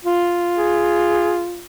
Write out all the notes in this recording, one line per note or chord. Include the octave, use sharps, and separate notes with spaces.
F4
G#4